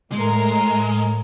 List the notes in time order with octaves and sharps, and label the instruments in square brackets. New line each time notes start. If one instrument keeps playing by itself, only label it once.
[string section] A2 A#4 [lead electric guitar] G#3